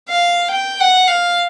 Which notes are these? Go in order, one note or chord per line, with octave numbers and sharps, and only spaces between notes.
F5
G5
F#5
F5